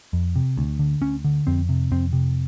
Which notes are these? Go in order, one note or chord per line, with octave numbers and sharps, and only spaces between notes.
F2
C3
D2
D3
D2 C#4
D3
F2 C4
C3
F2 C4
C3